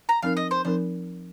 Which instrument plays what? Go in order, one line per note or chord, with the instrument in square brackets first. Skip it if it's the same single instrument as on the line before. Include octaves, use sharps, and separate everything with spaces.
[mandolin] A#5
[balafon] F3 C4 D#4 A#4 [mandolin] F5
[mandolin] D#5
C5
[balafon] F3 C4 D#4 A#4 [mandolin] C5